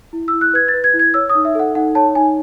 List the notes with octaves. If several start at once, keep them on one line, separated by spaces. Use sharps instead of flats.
E4
E6
E4
F#6
B4 G#6
A6
B4
G#6
E4
G#6
C#5 E6
D#6
D#4
E5
A4 F#5
D#4 F#5
C#5 A5
D#4 G#5